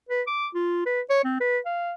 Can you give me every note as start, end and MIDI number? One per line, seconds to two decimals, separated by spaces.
0.09 0.22 71
0.27 0.47 86
0.55 0.83 65
0.86 1.01 71
1.10 1.23 73
1.24 1.37 60
1.41 1.59 71
1.66 1.94 77